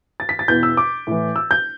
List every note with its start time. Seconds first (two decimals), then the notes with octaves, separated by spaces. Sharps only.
0.20 A6
0.29 B6
0.39 A6
0.48 E2 B2 G6
0.63 E6
0.77 D6
1.07 A2 E3
1.36 E6
1.51 G6